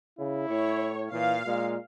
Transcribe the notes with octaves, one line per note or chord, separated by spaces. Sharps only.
C#3 E4
A2 C#5
A#2 E3 F5
A#2 G#3